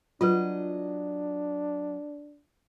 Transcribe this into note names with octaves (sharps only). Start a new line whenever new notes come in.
F#3 D4 F4 B4 D#5